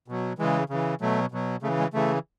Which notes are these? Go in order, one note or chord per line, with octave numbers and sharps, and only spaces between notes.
B2 F#3
C#3 E3 G#3
C#3 E3
B2 F#3 A3
B2 F#3
C#3 A3
E3
G#3
C#3 E3 A3